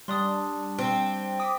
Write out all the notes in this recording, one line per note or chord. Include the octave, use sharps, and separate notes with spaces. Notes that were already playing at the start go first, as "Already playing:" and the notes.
G3 D4 C6 D#6
C4
D6 D#6 B6